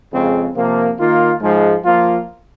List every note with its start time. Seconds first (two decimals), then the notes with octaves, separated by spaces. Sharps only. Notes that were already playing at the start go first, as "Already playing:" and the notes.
0.11 F2 C#3 G#3 C4
0.54 C3 F3 A#3
0.98 D#3 A#3 F4
1.40 G#2 F3 G#3
1.83 F3 A#3 F4